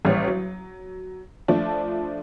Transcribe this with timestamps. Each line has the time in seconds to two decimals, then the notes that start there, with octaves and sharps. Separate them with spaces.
0.05 A1 G3 C#5
0.28 F#3
1.48 F3 A3 D4